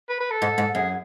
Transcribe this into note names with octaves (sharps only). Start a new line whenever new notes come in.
B4
B4
A4
G#2
G#2
F#2 G#4